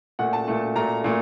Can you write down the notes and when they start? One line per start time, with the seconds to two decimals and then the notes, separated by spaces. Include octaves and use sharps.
0.19 A#2 A3 F#5
0.33 A5
0.48 A#2 A3
0.75 A#2 A3 A#5
1.04 A#2 A3